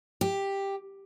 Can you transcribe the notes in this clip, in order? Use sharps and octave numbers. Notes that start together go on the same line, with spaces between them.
G4